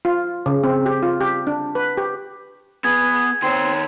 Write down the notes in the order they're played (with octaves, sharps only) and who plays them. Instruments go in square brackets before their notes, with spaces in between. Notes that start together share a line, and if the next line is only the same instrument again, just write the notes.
[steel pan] F4
C#3
C4
G4
F4
G4
D4
B4
G4
[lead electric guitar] B3 [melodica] G#4 [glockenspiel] G#6
[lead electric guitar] D#3 C#5 [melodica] C4 C6